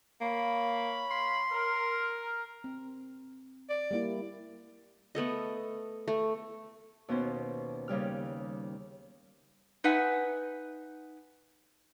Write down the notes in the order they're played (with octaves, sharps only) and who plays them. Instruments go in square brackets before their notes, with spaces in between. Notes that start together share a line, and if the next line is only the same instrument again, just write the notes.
[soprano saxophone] A#3 [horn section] C#5 F5 B5
[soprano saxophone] C6
[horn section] A#4
[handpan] C4
[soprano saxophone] D5
[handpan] G3 A#3 E4
[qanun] A3 B3 A4 D#5
A3
[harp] D#2 B2 B3 C#4 C5
D#2 C#3 G3 F6
[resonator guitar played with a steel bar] D#4 B4 E5 F#5 G#5